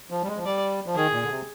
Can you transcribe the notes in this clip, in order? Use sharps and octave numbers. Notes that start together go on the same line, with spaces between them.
F3
G3
G#3
F3
G3 D5
F3
D#3 G#4
A#2
D3
C3